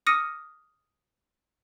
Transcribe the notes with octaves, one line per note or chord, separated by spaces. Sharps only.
D6 D#6 F6 A#6 C#7 D#7